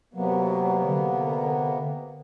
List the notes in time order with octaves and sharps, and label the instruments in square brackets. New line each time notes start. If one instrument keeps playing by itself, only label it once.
[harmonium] C3 A#3 B3 [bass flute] F#3
[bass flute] D3